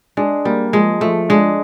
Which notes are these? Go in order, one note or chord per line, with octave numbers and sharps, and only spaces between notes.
G#3 D4
G3 A#3
F3 G#3
F3 A3
G#3 D4